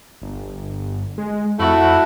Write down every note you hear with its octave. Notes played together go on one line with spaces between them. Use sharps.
G1
G#3
F2 A3 E4 F#4